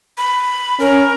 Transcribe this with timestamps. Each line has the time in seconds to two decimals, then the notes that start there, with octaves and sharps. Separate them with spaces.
0.18 B5
0.80 C#4 A#4